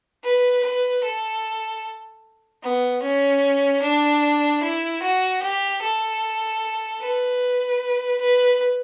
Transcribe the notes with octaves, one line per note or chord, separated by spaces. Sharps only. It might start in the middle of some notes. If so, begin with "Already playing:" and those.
B4
B4
A4
B3
C#4
D4
E4
F#4
G4
A4
B4
B4